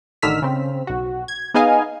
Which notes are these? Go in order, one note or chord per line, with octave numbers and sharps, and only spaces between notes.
A1 D3 D#3 E6 F6 B6
C#3 C4
B1 F#4
G#6
B3 D#4 G#4 D#5 F5 G#5